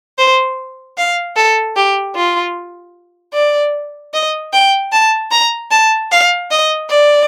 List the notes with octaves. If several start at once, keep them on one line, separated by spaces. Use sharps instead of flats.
C5
F5
A4
G4
F4
D5
D#5
G5
A5
A#5
A5
F5
D#5
D5